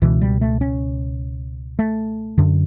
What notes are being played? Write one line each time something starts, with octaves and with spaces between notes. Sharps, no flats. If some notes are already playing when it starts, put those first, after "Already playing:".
C#2 B2 E3
G3
A3
C#4
A3
F#2 D3